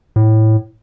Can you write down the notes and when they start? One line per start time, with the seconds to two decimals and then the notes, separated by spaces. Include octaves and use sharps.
0.16 A2